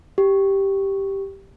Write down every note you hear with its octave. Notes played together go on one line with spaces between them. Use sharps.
G4